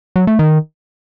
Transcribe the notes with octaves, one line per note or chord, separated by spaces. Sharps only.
F#3
A3
D#3